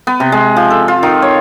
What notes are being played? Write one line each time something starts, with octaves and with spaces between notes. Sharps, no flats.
B3
C3
G#3
F3
A4
F4
D#3
C#5